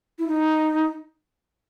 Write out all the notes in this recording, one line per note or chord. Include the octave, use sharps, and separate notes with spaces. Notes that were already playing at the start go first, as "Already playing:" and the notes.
E4
D#4